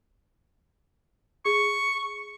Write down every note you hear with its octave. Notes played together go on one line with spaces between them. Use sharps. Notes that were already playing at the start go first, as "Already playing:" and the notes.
G#4 C#6